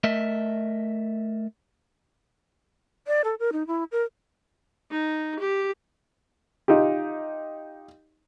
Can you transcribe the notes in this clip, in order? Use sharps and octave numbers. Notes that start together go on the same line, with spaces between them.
A3 A#4 D#5 E5
D5
A4
A#4
D#4
E4
A#4
D#4
G4
D#4 F4 G4